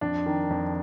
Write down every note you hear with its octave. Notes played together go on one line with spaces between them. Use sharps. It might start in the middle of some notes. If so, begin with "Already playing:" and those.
F2 D4
D#3
F2